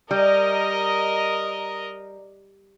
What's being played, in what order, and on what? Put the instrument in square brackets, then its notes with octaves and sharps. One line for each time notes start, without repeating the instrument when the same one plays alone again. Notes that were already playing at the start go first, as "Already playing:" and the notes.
[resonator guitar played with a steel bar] G3 [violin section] A#4 D#5